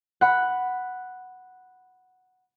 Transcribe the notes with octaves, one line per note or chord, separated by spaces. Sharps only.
F#5 B5